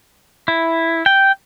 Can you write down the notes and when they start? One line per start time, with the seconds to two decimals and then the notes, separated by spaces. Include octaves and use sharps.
0.48 E4
1.06 G5